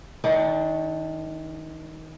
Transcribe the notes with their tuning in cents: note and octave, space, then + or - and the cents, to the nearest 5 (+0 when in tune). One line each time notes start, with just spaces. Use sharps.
D#3 +30 D4 +0 G5 +0